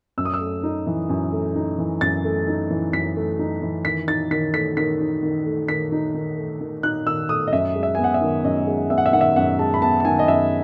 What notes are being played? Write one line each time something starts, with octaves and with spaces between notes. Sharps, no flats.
F#2 E6
D#6
E6
A3
D#4
E3
F#2
A3
D#4
E3
F#2 A6
A3
D#4
E3
F#2 B6
A3
D#4
E3
D#3 B6
D#4 A6
D#3 B6
A3 B6
D#3 B6
D#4
D#3
A3
D#3 B6
D#4
D#3
A3
D#3
D#4 F#6
D#3 E6
A3 D#6
D#5
F#2 E5
G#3
E5
B3 G#5
F#5
E5
D#3
F#2 D#5
G#3
B3 E5
F#5
E5
D#3 F#5
E5
F#2 F#5
G#3 A5
B5
B3 A5
A5
D#3 G#5
D#5
F#2 E5